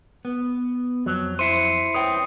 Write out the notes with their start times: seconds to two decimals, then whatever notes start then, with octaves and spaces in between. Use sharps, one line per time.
0.25 B3
1.06 F2 F#3
1.39 E4 C5 C7 C#7 D#7
1.94 B4 C#5 G5 D#6